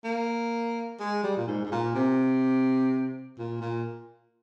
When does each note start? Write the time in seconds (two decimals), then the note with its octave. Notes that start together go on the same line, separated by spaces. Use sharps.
0.04 A#3
1.00 G#3
1.23 G3
1.37 A#2
1.48 G#2
1.65 G#2
1.72 A#2
1.95 C3
3.38 A#2
3.61 A#2